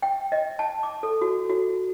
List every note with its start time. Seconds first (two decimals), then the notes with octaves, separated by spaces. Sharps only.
0.02 G5
0.32 D#5
0.59 A5
0.83 D6
1.03 A4
1.21 F#4
1.50 F#4